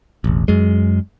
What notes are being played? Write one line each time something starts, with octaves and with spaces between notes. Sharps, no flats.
E1 A1
F#2 G#3